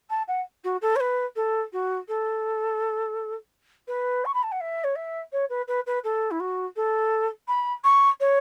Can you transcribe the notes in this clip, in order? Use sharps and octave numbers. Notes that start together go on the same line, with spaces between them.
A5
F#5
F#4
A4
C#5
B4
A4
F#4
A4
B4
C#6
B5
A5
F#5
E5
C#5
E5
C#5
B4
B4
B4
A4
E4
F#4
A4
B5
C#6
C#5